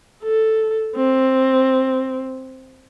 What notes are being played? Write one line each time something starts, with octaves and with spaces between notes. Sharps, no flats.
A4
C4